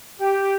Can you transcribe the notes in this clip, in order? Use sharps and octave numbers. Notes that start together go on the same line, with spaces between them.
G4